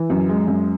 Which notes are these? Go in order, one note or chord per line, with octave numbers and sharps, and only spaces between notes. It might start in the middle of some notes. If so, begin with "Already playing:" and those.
Already playing: E3
F#2
G#3
F#2